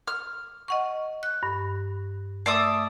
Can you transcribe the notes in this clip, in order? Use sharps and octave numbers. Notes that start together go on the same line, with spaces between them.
F6
D#5 F#5 C#6
F#6
G2
A3 D5 E5 D#6